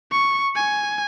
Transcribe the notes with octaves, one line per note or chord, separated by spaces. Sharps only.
C#6
G#5